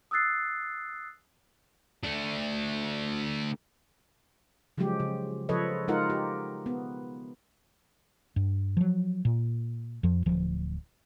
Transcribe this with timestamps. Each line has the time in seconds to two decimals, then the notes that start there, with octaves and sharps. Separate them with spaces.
0.11 D#6 E6 F#6 A6 C7
2.03 A3 D4
4.78 C#3 F3 F#3 G#3 G4
5.00 C#3
5.49 C#3 F3 A4 B4 C#5 D#5
5.88 G#3 D#4 F4 A#4 F#5
6.10 G4
6.66 B3
8.36 G2
8.77 F3 F#3
9.25 A#2
10.03 F2 F3
10.26 D1 F3